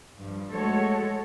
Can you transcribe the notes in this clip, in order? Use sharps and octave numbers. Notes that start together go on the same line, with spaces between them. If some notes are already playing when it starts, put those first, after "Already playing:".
G2 F3
G#3 A3 F#4 A4 C#5